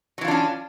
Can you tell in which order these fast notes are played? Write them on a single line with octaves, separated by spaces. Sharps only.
F#3 E3 F4 D4 C#4